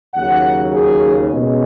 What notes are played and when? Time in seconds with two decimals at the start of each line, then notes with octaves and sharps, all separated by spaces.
0.15 D#2 C#3 F#3 F#5
0.72 G#4
1.30 B2 G#3 C#4